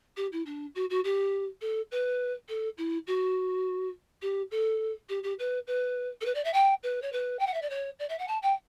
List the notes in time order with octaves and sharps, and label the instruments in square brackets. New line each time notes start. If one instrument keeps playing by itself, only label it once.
[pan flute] G4
E4
D4
F#4
F#4
G4
A4
B4
A4
E4
F#4
G4
A4
G4
G4
B4
B4
A4
B4
D5
E5
G5
B4
C#5
B4
G5
F#5
E5
D5
C#5
D5
E5
F#5
A5
G5